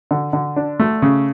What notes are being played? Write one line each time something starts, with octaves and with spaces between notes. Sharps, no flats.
D3
D3
D4
A3
C#3